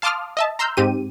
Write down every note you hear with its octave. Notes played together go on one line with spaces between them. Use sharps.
F5 A5 C6 D6 D#6 F6
D#5 E5 A5
A#5 C6 E6 F6 G6
G#2 C4 G4 D#7